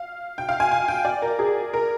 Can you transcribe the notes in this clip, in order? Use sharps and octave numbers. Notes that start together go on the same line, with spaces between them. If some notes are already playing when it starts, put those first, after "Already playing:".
Already playing: F5
G5
F5
G#5
G#5
G5
D5
A#4
G#4
A#4